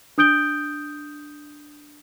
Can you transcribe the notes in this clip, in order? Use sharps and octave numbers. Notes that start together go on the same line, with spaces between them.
D4 D#6 G6 D7 G7